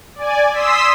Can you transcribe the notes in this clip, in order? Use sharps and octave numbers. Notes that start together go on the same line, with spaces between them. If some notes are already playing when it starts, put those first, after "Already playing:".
D5 G#5
C6 D#6 E6 B6